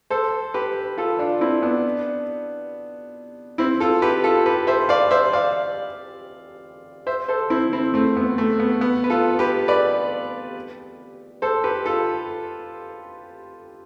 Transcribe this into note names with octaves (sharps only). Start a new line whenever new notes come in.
A4 C5
G4 B4
F4 A4
D4 F4
C4 E4
B3 D4
C4 E4
F4 A4
G4 B4
F4 A4
G4 B4
C5 E5
D5 F5
C5 E5
D5 F5
C5 E5
A4 C5
C4 E4
C4 E4
A3 C4
B3
A3
B3
B3
B4
F4 A4
G4 B4
B4 D5
A4 C5
G4 B4
F4 A4